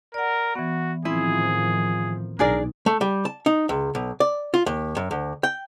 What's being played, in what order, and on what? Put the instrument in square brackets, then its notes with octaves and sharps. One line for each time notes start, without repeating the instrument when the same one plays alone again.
[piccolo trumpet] A#4 [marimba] D5 F#5
[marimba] E3 B3 [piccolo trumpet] F#4
[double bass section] A2 D#3 F3 [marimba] C4 [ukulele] E4 [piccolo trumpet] G#4
[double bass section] B1 [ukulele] D4 G#4 D5 [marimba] D#4 [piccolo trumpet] A#4
[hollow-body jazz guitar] A3
G3
A5
D#4
C#2
B1
D5
F4
D#2
F#2
D2
G5